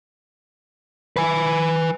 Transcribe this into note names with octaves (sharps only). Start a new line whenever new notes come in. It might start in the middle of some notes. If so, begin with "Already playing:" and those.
B4 G#5